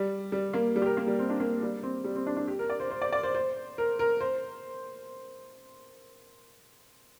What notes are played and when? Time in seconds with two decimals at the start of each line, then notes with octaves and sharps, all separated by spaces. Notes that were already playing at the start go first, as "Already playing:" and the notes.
Already playing: G3
0.32 G3
0.53 A#3
0.76 G3
0.82 G4
0.86 A#4
0.97 A#3
1.07 G3
1.19 C4
1.29 D4
1.40 A#3
1.62 G3
1.83 C4
2.04 G3
2.16 C4
2.26 D4
2.37 D4
2.48 G4
2.59 A#4
2.70 D5
2.80 C5
2.91 C5
3.02 D5
3.12 D5
3.23 C5
3.35 C5
3.78 A#4
3.99 A#4
4.21 C5